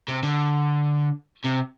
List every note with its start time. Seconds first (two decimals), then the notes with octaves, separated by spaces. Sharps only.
0.08 C3
0.23 D3
1.45 C3